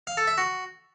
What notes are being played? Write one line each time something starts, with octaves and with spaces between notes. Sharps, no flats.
F5
A4
E5
F#4